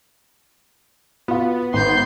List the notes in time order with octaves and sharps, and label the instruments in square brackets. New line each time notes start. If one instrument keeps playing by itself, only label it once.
[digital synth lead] B3 [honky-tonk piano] F4 F#4
[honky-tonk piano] G#1 [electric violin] C6 G6